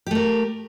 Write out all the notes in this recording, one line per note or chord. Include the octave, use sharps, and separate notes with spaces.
A3 G4 A#4